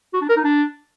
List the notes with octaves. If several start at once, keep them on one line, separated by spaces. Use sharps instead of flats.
F#4
D4
A#4
D#4
D4